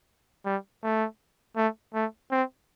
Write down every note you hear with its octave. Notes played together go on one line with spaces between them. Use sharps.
G3
A3
A3
A3
C4